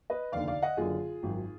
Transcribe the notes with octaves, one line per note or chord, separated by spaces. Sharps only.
B4 D#5
F1 D#2 D3 D5 F5
D5 F5
D#5 F#5
F#1 F#2 D3 F4 G#4
G#1 F#2 D#3